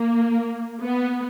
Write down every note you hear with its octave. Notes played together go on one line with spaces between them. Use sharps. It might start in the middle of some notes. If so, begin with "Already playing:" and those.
Already playing: A#3
B3